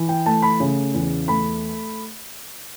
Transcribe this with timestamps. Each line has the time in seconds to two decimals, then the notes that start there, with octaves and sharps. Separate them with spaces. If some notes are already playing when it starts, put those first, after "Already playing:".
Already playing: E3
0.09 G5
0.26 A3 A5
0.42 B5
0.60 C#3
0.94 E2
1.28 A3 B5